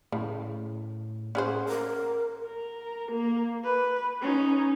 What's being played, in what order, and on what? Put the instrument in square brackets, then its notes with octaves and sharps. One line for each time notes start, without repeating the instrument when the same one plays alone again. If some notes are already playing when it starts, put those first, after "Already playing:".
[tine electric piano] A2 [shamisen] C#3
[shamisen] C#4 G#4 C5 [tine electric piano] F#5
[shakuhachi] A#4
[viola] A#4
A#3
B4
C#4 D#4